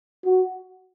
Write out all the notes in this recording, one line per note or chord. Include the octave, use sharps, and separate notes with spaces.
F#4